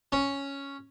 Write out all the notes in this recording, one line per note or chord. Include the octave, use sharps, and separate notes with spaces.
C#4